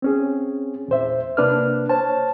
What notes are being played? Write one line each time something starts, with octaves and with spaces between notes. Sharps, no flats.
C4 C#4 G#4
E2 A#2 C5 E5
C3 A#3 D4 B4 F6
C5 C#5 A5